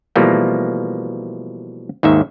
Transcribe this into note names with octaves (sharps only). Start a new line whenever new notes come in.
B2 E3 F3 G3 A3 A#3
D#2 G#2 D#3 E5